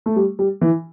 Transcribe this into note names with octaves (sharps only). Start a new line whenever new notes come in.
A3
G3
G3
E3